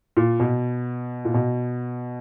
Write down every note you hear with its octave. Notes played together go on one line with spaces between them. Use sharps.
A#2
B2
A#2
B2